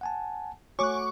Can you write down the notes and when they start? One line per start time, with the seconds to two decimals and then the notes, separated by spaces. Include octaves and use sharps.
0.01 F#5 G#5 A5
0.79 A3 F#4 C#5 G#5 C#6 D6 F#6